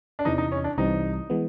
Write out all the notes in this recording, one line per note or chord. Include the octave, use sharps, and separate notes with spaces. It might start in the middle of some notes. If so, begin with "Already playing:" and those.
D4
E2 C3 E3 D#4
D#4
C#4
D4
C2 C3 E3 G3 C4 D#4
E3 G#3 B3